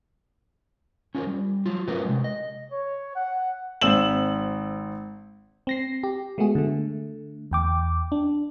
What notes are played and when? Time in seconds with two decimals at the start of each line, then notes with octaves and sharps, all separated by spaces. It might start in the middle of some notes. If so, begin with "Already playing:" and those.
1.15 C#4 F4 A4 A#4 C5
1.27 G3
1.66 F#3 F4
1.88 F3 A3 C#4 A#4 B4
2.05 C3 G#3
2.24 D#5
2.71 C#5
3.15 F#5
3.82 G#1 C4 E6 E7 F#7
5.67 C4 A#6 C7
6.03 G4
6.38 G#3 A3 B3 F#4 G#4
6.55 D3 A3
7.51 E2 G5 D6
8.12 D4